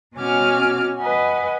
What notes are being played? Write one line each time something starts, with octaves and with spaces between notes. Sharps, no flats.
B2 C#4 F#4 G#5 D6 F6
B4 D#5 F#5 G#5